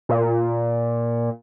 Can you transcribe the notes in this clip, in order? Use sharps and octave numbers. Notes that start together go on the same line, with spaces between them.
A#2